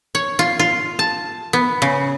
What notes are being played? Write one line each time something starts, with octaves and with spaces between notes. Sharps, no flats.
C#5
F4
F4
A5
B3
C#3